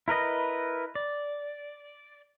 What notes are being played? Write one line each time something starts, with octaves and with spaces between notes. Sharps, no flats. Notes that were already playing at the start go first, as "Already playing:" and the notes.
E4 A#4 B4 D#5
D5